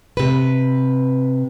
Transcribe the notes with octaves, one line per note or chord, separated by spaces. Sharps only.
C3 B4